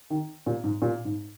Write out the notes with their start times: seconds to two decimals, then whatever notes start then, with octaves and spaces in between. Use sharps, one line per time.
0.10 D#3
0.46 A#2
0.64 G#2
0.82 A#2
1.05 G#2